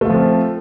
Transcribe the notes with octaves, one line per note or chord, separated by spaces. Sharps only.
F3 A3 C4 F4